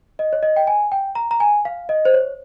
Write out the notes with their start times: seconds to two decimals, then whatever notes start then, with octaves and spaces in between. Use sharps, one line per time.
0.19 D#5
0.33 C#5
0.43 D#5
0.56 G5
0.67 G#5
0.92 G5
1.15 A#5
1.31 A#5
1.40 G#5
1.65 F5
1.89 D#5
2.05 C5
2.14 C#5